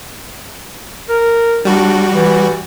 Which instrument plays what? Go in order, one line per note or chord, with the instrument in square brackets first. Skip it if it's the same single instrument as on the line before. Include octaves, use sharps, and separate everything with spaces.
[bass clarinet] A#4
[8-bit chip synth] G3 F#4 [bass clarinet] D4
[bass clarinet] E3